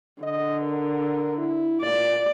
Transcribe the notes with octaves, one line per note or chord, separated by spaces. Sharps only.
D3 D#5
A#4
E4
A#2 D5